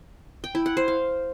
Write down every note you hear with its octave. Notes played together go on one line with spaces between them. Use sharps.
G5
E4
F#5
C5
F5